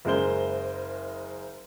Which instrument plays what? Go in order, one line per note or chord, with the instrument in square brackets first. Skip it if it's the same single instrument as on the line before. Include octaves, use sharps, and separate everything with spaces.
[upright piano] F#1 G#3 A#4 C5 G7